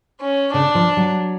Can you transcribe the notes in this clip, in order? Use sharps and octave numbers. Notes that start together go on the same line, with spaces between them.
C#4
C#3 D4
F3
F#3